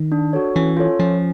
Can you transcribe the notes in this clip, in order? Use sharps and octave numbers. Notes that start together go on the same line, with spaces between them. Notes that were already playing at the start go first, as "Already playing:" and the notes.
Already playing: D#3
D4
F#4 A4 C#5
E3 C#4
F4 A4 C#5
F3 C#4